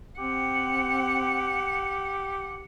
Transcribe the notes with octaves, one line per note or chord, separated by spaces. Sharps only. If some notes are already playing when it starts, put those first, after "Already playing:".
C4 G4 F#5